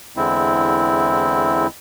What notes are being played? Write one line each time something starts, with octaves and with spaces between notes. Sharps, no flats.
E2 D3 G#3 C4 E4